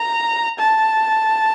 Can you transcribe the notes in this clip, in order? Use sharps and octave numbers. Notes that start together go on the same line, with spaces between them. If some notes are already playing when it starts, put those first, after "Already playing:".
Already playing: A#5
A5